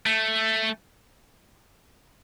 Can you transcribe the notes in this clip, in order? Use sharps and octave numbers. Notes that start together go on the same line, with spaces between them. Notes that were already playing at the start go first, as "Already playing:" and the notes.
A3